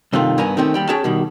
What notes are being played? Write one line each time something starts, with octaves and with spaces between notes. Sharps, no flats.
G2 C3 D#3 A3 F4
G2 B3 A#4 G#5
D#3 A3 C4 C#4
D#2 G3 G5
C#4 F#4 G#4 C#5 G5 A5
B2 D#3 G3